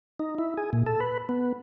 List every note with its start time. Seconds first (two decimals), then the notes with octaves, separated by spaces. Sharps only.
0.19 D#4
0.38 E4
0.57 G#4
0.73 A#2
0.86 A4
1.00 B4
1.29 B3